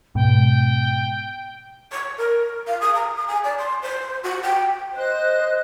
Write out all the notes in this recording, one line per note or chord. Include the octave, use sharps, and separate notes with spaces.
G#2 B2 G5
C#5
A#4
F5
D#6
A#5
D#6
G#5
D5
C6
C5
F#4
G5
C5 D#5 F#6